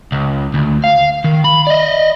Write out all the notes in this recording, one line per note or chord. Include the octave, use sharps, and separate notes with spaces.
C#2
D2
F5
D#3
B5
D5 D#5